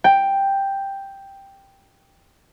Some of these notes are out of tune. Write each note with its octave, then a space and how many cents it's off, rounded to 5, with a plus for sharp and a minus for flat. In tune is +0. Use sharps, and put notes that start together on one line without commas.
G5 +5